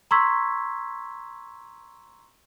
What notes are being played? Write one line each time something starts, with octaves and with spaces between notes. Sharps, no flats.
A#5 C6 C#6 E6 G#6 B6